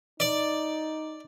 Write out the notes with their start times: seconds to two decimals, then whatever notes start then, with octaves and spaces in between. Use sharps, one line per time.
0.20 D#4 D5